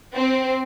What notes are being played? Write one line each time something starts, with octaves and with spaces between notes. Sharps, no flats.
C4